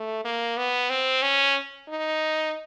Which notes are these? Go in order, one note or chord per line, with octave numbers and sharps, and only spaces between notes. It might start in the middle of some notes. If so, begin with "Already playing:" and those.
Already playing: A3
A#3
B3
C4
C#4
D#4